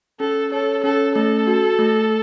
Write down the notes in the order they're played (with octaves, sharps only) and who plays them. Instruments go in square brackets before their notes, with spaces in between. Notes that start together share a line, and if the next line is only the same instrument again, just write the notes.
[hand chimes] C#4 [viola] A4
[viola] A4 [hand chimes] C#5
[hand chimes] C#4 [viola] A4
[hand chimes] A3 [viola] A4
[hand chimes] F#4
A3